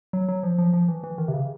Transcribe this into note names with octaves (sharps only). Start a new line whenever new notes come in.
F#3
F#3
F3
F3
F3
E3
E3
D#3
C3
C#3